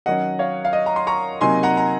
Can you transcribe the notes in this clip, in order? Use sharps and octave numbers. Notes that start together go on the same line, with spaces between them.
D#3 F#3 C#4 D#5 F#5
C#5 F5
F5
D#5
A#5
C6
A#5 C#6
C3 F#3 A#3 D#4 G#5 C6
F#5 A#5
A#5